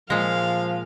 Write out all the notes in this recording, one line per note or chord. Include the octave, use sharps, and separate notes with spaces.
A#2 F3 G#3 F5